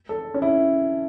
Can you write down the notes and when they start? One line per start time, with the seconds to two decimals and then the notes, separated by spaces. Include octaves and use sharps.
0.09 A4
0.34 C#4
0.42 E4